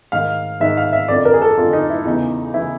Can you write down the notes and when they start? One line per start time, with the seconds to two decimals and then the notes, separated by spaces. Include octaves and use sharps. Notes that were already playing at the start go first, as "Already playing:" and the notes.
0.12 G#2 D#3 F5
0.60 G#2 D#3 E5
0.77 F5
0.93 E5
1.08 F2 D3 D5
1.25 A#4
1.34 G#4
1.42 A4
1.57 F2 D3 F4
1.73 D#4
1.90 E4
2.05 E2 C#3 E3 D#4
2.54 C#3 E3 E4